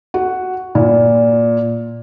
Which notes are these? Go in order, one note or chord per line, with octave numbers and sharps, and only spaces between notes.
F#4
A#2